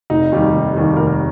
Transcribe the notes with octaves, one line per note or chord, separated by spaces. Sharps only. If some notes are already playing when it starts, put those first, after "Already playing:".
F1 D#4
D#2 D#3 G3
F1
D#2 D#3 G3
F1 A#4